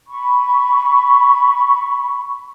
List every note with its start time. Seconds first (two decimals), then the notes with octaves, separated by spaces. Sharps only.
0.07 B5 C#6